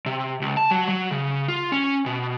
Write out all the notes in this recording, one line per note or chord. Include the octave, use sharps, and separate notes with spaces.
C3
C#2
A5
F#3
F#3
C#3
F4
C#4
B2